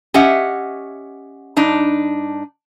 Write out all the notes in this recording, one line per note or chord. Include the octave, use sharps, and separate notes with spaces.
C#4 G4 D#5 E5 F#5
G2 D4 D#4